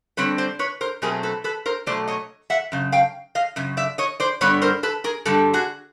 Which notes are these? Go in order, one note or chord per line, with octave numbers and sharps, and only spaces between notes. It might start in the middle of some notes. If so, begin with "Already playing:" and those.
D3 G3 C4 B4 C#5
C5 D5
B4 C#5
A#4 C5
B2 F#3 A3 C4 G#4 A#4
A4 B4
A4 B4
A#4 C5
B2 F#3 A3 C5 D5
C#5 D#5
E5 F#5
F#2 C#3
F5 G5
D#5 F5
F#2 C#3
D5 E5
C#5 D#5
C5 D5
G2 D3 G3 B3 B4 C#5
A#4 C5
A4 B4
G#4 A#4
G2 D3 G3 A4
F#4 G#4